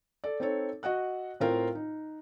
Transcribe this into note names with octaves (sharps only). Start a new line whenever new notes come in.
A4 D5
C4 D#4 A4 C#5
F#4 D#5 F#5 F#6
A2 C4 F4 A#4 F5 G5
D#4